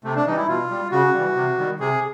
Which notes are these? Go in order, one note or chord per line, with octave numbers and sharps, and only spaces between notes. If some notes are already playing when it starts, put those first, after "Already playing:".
C3 A3
D4
E3 G3 D#4
E4
B2 F4
G3
C#3 F#4
E3 G3
C3
D#3 G3
C3 G#4